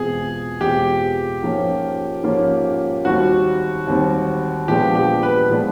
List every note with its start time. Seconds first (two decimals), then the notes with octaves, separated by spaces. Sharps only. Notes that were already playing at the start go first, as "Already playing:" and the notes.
Already playing: E2 B2 G#3 C4 F4 G#4
0.61 E2 B2 G#3 C4 F4 G4
1.42 G#2 F3 A#3 C#4 F4
2.23 G#2 F3 A#3 C#4 F4
3.05 D#2 D#3 G3 C4 F#4
3.87 D#2 D#3 G3 C4
4.68 A#2 F3 G#3 B3 D4 G4
4.95 G4
5.23 B4
5.50 A#2 F3 G#3 B3 D4